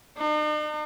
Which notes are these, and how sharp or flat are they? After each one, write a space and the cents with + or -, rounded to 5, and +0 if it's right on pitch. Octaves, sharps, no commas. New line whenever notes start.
D#4 -45